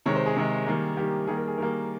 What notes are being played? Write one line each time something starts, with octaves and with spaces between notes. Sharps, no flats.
C3 D#3 G#3 C#5
C5
G#4
C3 D#3 G#3
D#3 G3 A#3
D#3 G3 A#3 G4
D#3 G3 A#3 G#4
A#4
G#4
D#3 G3 A#3 A#4